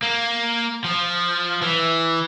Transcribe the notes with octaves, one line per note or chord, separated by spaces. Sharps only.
A#3
F3
E3